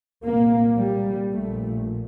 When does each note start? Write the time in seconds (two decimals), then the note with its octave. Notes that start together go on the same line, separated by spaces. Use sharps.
0.24 C2 A#2 A#3
0.78 G3
1.31 A#1 A#2 A3